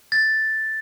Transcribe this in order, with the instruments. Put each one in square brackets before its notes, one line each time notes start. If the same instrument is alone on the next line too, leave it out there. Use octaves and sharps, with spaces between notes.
[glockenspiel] A6